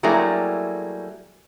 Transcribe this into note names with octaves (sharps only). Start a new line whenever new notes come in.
F#3 G3 A3 A#3 E4 G#4